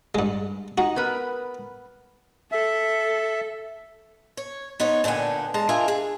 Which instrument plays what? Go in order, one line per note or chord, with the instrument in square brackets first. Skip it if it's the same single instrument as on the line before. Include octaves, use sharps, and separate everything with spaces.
[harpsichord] G2 G#3
[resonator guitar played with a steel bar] D#4 [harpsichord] F#4
[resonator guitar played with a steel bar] B3 A#4 B4
[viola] A4 [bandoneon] E5
[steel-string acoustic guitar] C#5
B3 D#4 C5 C#5
A#2 D3 B3 G5 G#5
G#3 A5 A#5
D4 F4 A#4 D#5 E5 G#5
G#4